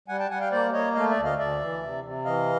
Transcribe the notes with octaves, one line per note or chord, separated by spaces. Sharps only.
G3 F#5 G#5
G5 A5
G3 F#5 G#5
F5 G5
A#3 C5 D5
A#3 C#5 D#5
A3 D#5 F5
D5 E5
D2
D#5 F5
D2 D5 E5
E3
C3
C3
E3 D#5 F5